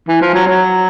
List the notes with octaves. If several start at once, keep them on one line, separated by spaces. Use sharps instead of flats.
E3
F3
F#3
F#3